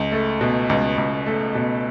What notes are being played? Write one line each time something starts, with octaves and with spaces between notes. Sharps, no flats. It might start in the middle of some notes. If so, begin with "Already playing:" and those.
Already playing: C#2
A3
B2
C#2
C#2
A3
B2